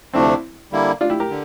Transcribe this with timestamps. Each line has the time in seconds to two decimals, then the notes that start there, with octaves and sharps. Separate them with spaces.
0.14 D2 C3 F3 A3 C4 D4 E4
0.72 D3 G3 A#3 E4
1.01 D4 F4
1.10 E4 G4
1.20 G4 A#4
1.30 D3